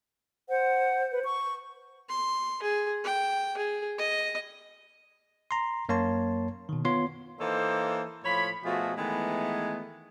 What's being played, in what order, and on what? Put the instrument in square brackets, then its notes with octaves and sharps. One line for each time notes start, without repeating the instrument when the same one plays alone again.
[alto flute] C5 [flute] F#5
[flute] B4
C#6
[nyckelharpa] C6
G#4
G5
G#4
D#5
[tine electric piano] A#5 C6
F#2 A#3 C#5 A5 C6
B2 D#3
B3 F4 C#5 C6
[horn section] E3 A#3 D#4 A4 C5
A2 F3 C#5 B5
B2 F3 A3 F4 F#4 G#4
D#3 E3 G#3 A3 B3